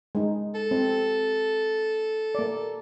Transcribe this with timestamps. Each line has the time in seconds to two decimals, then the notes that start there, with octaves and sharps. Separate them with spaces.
0.15 G#3 D#4
0.54 A4
0.71 C4
2.35 A#3 D5